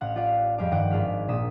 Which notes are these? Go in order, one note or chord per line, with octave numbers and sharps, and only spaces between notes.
A1 F5 F#5 F6
F4 G4 D5 F5
F2 G3 G4 G#4 F5 D6
G2 D#3 D5 F#5 G5 D7
G#1 F4 G#4 F6 B6
A#1 A#2 D#6 B6 E7